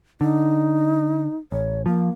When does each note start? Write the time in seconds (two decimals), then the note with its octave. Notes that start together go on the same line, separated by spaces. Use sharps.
0.21 D3 D#4
1.52 A1 C#5
1.86 F3 A#3